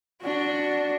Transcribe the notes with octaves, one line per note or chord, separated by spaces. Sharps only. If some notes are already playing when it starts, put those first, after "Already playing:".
D4 F#4